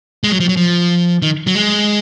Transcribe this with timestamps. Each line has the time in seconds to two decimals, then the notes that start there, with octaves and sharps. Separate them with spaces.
0.24 G#3
0.32 F#3
0.40 F3
0.49 F#3
0.57 F3
1.22 D#3
1.47 F#3
1.55 G#3